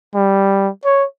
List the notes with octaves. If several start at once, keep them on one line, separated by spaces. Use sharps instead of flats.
G3
C#5